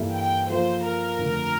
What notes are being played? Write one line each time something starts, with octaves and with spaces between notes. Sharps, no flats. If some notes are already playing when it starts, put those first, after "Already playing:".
Already playing: G2 E3 A#3 E4 A4
G5
F3 A#3 F4 A4 C5
A#4
F2 D3 A3